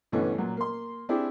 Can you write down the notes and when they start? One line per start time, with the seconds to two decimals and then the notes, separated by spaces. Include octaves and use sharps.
0.12 G2 B2 D3 E3 A3 C#4
0.38 A#2 F#3
0.57 A#3 C6
1.09 C4 D4 E4 G4 G#4